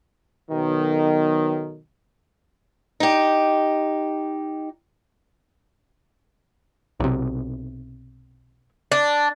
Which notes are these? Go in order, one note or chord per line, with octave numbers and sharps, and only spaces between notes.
B1 D#3
D#4 G4
B1 C3
D4